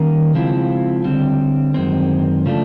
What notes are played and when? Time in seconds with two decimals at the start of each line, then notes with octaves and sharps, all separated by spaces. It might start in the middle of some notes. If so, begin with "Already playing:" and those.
Already playing: D#3 G3 A#3 C#4
0.34 C#3 F3 G#3 C4 E4
1.04 D3 G3 C4
1.74 F#2 D#3 G#3 C4
2.46 C#3 F3 A3 D4